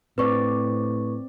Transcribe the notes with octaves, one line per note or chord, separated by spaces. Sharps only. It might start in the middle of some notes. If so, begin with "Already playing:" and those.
A2 C4 B4 D5 C#6